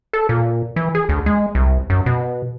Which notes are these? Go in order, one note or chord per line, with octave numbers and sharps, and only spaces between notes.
A4
A#2
E3
G#4
D2
G#3
C2
F#2
B2